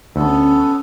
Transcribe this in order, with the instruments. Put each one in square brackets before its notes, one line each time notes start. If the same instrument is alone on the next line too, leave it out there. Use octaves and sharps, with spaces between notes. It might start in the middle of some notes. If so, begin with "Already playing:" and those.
[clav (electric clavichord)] D2 [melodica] B3 A4 [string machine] C#4